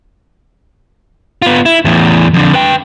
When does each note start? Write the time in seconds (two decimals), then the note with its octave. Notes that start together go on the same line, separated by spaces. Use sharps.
1.42 B3 F4
1.66 E4
1.85 E2 A2
2.34 F2 D3
2.54 B4 G5